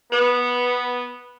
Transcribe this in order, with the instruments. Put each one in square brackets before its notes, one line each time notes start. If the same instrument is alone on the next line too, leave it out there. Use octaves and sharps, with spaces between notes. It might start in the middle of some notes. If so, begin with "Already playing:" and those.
[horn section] B3